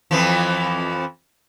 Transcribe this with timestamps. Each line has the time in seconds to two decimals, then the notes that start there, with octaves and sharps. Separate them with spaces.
0.11 F2 E3 F3